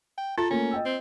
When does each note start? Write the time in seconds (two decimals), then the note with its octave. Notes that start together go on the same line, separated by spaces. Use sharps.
0.18 G5
0.38 F4 A4 A#5 A6
0.51 A3 A#3 C#4
0.71 D#5 G5 E6
0.85 C4